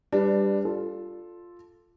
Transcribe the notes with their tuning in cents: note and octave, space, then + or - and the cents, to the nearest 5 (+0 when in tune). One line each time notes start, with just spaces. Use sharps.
G3 +10 D4 +0 B4 +20
F4 +0 A4 -5